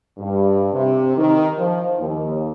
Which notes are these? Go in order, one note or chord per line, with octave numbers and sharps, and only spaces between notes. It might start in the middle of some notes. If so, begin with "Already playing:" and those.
G2
C3
D#3
F3
D#2